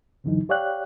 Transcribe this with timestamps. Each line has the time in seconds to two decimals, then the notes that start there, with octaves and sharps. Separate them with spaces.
0.24 C#2 F#2 D3 E3 F#3 D#4
0.49 G4 C#5 D5 F5 G5 F#6